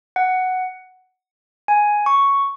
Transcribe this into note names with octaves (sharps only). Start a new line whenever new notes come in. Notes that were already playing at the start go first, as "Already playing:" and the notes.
F#5
G#5
C#6